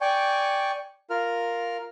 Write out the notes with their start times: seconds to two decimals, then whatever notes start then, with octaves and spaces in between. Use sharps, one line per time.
0.01 D5 G5 G#5 C#6
1.10 F4 A#4 F6